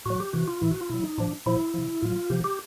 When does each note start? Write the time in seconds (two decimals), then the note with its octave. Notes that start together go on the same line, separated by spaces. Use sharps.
0.06 A2 F#3 F#4
0.20 G4
0.33 C3 E3 F#4
0.48 F4
0.61 A2 E3 E4
0.71 F#4
0.81 F4
0.89 B2 F#3 E4
1.04 D#4
1.18 A2 F3 D4
1.46 A#2 F3 E4
1.74 C3 F3
2.02 A2 F#3 F4
2.30 C3 F3 G4
2.44 G4